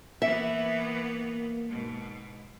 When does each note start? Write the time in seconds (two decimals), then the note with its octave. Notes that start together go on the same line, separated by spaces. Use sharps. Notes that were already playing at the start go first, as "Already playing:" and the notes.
0.22 E3 A#3 B3 E5
1.69 G#2 B2